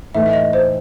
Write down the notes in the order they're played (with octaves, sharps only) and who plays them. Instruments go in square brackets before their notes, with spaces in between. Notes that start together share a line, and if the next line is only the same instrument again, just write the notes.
[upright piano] A2 E3 A3 D#4 [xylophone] E5
[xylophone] E5
D#5
C5